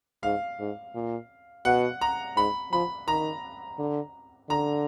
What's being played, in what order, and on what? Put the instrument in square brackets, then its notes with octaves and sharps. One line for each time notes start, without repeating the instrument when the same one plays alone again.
[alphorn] G#2 [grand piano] F5
[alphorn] G#2
A#2
[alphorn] B2 [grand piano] F#5
[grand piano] A#5
[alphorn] G#2 [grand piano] B5
[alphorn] F3 [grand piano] B5
[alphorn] D#3 [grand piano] A#5
[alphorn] D3
[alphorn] D3 [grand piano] A#5